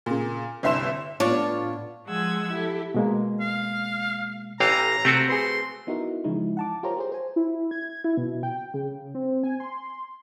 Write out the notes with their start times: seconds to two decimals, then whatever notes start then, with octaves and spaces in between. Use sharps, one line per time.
0.06 A#2 C#3
0.63 G1 C2 E5 C6 E7
1.20 A2 B3 D4 F4 C#5
2.07 F3 G#3 G#4 F#5 E6 G#6
2.52 E4 G4 A4
2.94 B2 G#3 A#3
3.40 F5
4.60 A1 E3 F5 G5 A#5 G6
5.05 C3 A3 C4 F#4
5.29 G#4 B4 C6
5.87 B3 D#4 E4 F#4 A#4
6.24 C#3 E3 F3 G#3 D#4 E4
6.57 F#5 A5 D6
6.83 F4 G4 A#4 C5 C#5 A#5
6.97 F#4 G#4 C5
7.12 C5 G#5
7.36 E4
7.71 G#6
8.04 E4
8.17 B2
8.43 G5
8.74 C#3
9.15 C4
9.43 G#5
9.60 C6